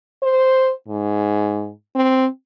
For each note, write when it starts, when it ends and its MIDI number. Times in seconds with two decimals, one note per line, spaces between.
0.23 0.72 72
0.88 1.70 44
1.95 2.26 60